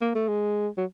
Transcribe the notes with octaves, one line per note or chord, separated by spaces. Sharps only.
A#3
A3
G#3
F#3